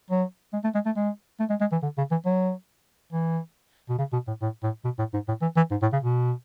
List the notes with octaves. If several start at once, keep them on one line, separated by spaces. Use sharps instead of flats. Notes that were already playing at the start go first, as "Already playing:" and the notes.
F#3
G#3
A3
G#3
A3
G#3
A3
G#3
G#3
E3
D3
C#3
E3
F#3
E3
B2
C#3
B2
A2
A2
A2
B2
A2
G#2
A2
E3
E3
G#2
A2
C#3
B2